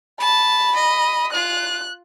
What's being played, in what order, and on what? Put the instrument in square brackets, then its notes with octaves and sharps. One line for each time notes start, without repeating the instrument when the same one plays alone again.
[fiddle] A5 [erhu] B5
[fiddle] D#5
[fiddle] F4 [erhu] F#6